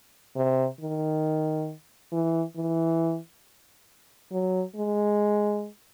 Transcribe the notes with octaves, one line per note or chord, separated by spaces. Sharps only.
C3
D#3
E3
E3
F#3
G#3